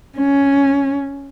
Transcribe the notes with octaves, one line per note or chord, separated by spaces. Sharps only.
C#4